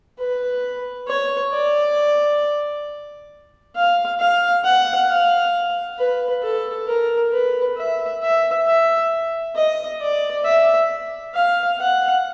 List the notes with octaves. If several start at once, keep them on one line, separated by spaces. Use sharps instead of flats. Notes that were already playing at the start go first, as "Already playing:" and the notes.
B4
C#5
D5
F5
F5
F#5
F5
B4
A4
A#4
B4
E5
E5
E5
D#5
D5
E5
F5
F#5